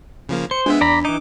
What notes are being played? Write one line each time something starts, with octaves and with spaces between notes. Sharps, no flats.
C#3 F3 A#3
C5 C#7
G#3 B3 D4 E5
E2 D5 A#5 B5
E3 D#4 D6